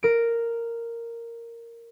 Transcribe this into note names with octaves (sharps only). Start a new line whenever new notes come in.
A#4 D7